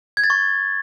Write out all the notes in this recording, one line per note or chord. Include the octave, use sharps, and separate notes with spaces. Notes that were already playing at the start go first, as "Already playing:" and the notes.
G#6
A6
C#6